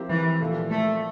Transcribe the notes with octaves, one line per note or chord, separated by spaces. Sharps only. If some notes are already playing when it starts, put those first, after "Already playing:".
Already playing: F3 C4 E4 G4 A#4
E3
A#2 F3 A3
A3